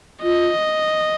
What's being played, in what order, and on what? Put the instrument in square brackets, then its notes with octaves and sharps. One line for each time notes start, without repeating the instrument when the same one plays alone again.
[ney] F4 [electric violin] D#5